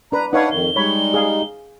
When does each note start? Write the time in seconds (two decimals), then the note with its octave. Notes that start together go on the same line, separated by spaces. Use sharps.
0.12 D4 B4 A#5
0.33 D4 D#4 B4 C#5 F5 F#5
0.52 F2 D#3 G7
0.76 G3 G#3 D#4 C#5 B5
1.14 G#4 F5